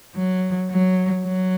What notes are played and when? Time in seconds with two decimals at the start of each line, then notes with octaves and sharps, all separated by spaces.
0.17 F#3
0.71 F#3
1.25 F#3